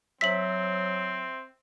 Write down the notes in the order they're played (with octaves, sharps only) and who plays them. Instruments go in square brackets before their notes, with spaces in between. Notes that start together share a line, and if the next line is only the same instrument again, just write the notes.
[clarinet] F#3 [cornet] C4 [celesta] C5 E5 E6 [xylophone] B6 F#7